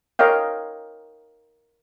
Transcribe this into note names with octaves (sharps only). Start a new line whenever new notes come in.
A#4 C#5 D#5 F5 G5